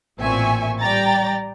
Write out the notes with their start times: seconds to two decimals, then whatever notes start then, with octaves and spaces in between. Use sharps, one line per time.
0.20 A1 A#2 C4 E5 G#5 C#6
0.80 G3 D5 G5 A#5 A6